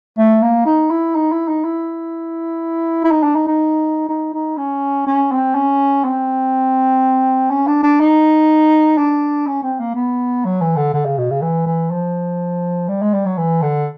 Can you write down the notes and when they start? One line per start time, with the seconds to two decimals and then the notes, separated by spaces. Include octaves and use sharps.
0.18 A3
0.42 A#3
0.66 D#4
0.90 E4
1.15 D#4
1.32 E4
1.48 D#4
1.64 E4
3.04 E4
3.11 D#4
3.23 D4
3.35 D#4
3.47 D#4
4.09 D#4
4.34 D#4
4.57 C#4
5.07 C#4
5.32 C4
5.55 C#4
6.04 C4
7.50 C#4
7.67 D4
7.83 D4
8.00 D#4
8.97 D4
9.47 C#4
9.63 C4
9.80 A#3
9.95 B3
10.45 F#3
10.61 E3
10.77 D3
10.94 D3
11.05 C#3
11.18 B2
11.31 C#3
11.42 E3
11.66 E3
11.91 F3
12.89 G3
13.02 G#3
13.14 G3
13.26 F#3
13.38 E3
13.62 D3